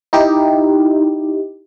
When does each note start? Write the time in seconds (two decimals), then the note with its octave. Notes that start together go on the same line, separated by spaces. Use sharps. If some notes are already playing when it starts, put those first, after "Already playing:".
0.13 D#4 E4 G4